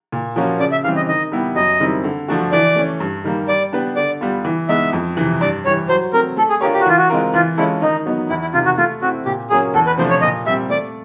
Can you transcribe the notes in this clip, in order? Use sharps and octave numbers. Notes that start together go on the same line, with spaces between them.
A#2
F3 A#3 C#4 F#4
C#3 D5
E5
E3 G3 C4 F5
D#5
D#3 D#5
G3 B3 E4 G4
F#2 D#5
D#3 G3 C4 E4
D3
F3 A3 D4 F#4
E3 D5
A3 C#4
G2
D#3 G3 A#3
G3 D5
B3 D4 G4 B4
D3 D5
G3 B3 D4 F4
E3
G#3 B3 D#4 E5
F2
C3 E3
G2 D5
E3 G3 C#5
F#3 C5
A3 C4 A#4
A3 A4
G#4
D4 F4 G4 A#4 C#5
G4
F#4
E3 F4
F#4
G#3 C4 F4 A#4
E3 F4
G#3 C#4 E4 F4 A4
D#3 D#4
F#3 B3 D#4
E2 E4
E4
C3 D#3 F4
F#4
A3 F4
C4 E4 F#4
A#2 G4
F#3 A#3 C#4 G#4
E2 A4
B4
C3 F3 A3 D4 C5
C#5
A#2 D#5
G3 C4 E5
A3 D5